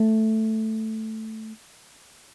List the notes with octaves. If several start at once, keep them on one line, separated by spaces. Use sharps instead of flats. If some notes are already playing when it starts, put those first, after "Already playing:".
Already playing: A3